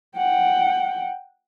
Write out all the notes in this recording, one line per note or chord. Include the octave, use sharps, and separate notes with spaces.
F#5 G5